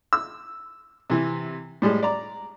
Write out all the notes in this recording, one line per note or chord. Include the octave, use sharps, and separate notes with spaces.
E6
C3 E3
A2 G3 G#3
D5 A#5